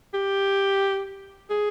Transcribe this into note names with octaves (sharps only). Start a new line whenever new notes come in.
G4
G#4